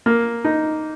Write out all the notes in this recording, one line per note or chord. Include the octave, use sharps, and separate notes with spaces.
A#3
D#4